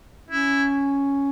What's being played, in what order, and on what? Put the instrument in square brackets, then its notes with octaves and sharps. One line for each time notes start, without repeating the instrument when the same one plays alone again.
[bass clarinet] C#4 [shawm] E4